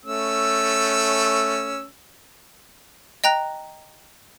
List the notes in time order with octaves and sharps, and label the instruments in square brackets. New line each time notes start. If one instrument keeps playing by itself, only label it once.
[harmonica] A3 C#4 E6
[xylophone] D#5 G5 A#5 F#6 A#6